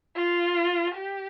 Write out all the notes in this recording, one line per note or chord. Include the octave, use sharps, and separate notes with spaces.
F4
G4